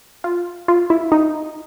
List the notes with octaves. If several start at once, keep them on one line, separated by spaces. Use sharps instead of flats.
F4
F4
E4
D#4